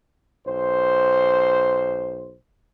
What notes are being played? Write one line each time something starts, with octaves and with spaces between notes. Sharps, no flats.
B1 C5